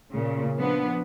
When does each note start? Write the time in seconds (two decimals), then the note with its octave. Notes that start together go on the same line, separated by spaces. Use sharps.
0.11 A#2 C#3
0.58 F3 B3 D4